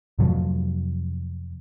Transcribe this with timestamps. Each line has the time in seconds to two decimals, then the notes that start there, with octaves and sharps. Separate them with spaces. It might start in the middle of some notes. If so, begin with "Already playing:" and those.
0.19 F2 C3 F3 F#3